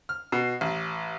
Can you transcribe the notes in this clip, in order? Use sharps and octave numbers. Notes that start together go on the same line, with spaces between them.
F6
B2
A1